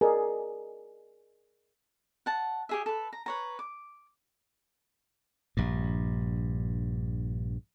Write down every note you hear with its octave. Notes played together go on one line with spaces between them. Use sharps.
G#4 A#4 D5 D#5
F#5 A5
G4 G#4 E5
A4 B4
A#5
B4 C#5 A#5
D6
A#1 G2